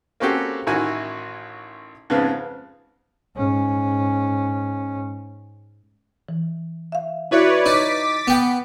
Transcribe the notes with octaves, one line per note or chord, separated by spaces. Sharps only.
A#3 C4 C#4 F#4 G4 A4
A1 D#3 E4 F#4 G#5
F2 G#2 C#3 B3
G#2 C#4
E3
E5 F5
E4 F#4 B4 C#5 D5 E5
D#4 D6 A6 B6
B3 G5